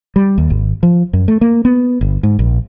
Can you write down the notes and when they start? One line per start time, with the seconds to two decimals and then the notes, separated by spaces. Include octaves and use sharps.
0.16 G3
0.38 D#2
0.50 G#1
0.83 F3
1.13 F#2
1.28 A3
1.41 A#3
1.65 B3
2.01 G1
2.23 G#2
2.39 A#1